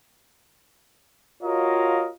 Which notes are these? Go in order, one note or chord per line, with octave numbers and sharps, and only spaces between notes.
F4 F#4 A#4 C#5 D#5 F5